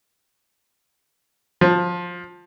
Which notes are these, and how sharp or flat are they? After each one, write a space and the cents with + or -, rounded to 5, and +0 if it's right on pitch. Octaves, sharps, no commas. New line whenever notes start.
F3 +15